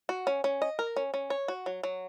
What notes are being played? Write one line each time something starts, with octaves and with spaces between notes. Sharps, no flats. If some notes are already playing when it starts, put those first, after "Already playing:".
F#4
C#4
C#4
D#5
A#4
C#4
C#4
C#5
F#4
F#3
F#3